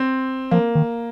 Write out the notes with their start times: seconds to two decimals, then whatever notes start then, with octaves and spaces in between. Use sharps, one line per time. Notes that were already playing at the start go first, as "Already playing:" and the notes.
Already playing: C4
0.51 F3 A#3
0.75 D#3